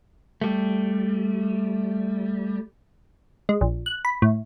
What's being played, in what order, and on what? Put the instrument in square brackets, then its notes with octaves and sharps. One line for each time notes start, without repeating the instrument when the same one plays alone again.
[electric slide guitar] G3 A3
[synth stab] G#3
A#1
F#6
B5
A2